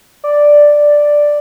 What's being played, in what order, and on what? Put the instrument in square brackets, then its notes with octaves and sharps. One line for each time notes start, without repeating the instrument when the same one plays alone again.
[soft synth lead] D5